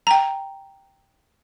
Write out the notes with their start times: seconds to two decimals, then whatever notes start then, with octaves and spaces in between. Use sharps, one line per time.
0.07 G5 A#5